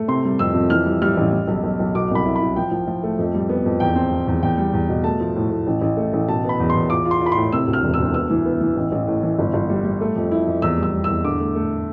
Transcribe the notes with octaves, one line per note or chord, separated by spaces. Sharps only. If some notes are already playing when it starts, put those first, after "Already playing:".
Already playing: A3
C3 C6
G3
F2 E6
F2
E3 F6
G3
G3 F6
A1
G3
B1
B1
B1
B2 D6
C2
B5
E4
B5
E4
F3 G5
F3
F3
A3
F2
G3
B3
F2
E2 G5
C4
F3
E2
E2 G5
G3
E2
B2
A3 A5
F3
A2
A2
A1
A1
A3
A1
B2 A5
B3 B5
E2
C6
E2
F4 D6
F4
C6
F4
B5
A2 C6
C3 E6
D2
F6
E1
E6
D2
B3 E6
E3
B3
E3
A1
A1
A2
E3
G1
G1
G3
G3
A3
F2
E4
F2
E2 E6
G3 E6
G3
E2 E6
D3 D6
A3
A3